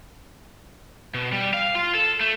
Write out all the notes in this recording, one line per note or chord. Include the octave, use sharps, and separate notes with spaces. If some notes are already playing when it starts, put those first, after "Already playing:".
B2
G3
F5
F4
A4
A3